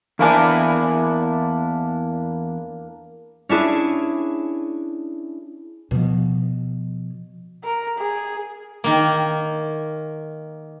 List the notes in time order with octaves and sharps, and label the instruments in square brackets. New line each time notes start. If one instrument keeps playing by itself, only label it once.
[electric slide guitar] E2 E4 G#5 [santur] A#3 D4
[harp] C#4 D4 E4 G#4
[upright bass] B2 F3
[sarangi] A#4
G#4
[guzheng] D#3 A#3